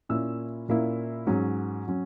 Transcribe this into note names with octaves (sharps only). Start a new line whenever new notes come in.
A#2 A#3 C#4 E4 E6
A#2 A#3 C#4 E4
G#2 F#3 C#4
F#3 C#4